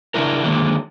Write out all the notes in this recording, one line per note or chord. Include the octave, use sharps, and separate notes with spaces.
C#3 G#3 D4 E4 A#4
D3 D#3 F#3 G#3 A#3